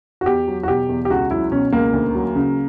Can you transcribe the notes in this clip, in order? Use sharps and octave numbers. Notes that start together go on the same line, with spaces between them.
F#4
E2 G4
F#3
F#4
B2 G4
E2
G4
C#2 F#4
F#3 E4
B2 C#4
C#2 A#3
D2
F#3
C#3